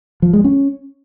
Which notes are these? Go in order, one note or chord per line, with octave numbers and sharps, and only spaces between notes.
F3
G#3
C#4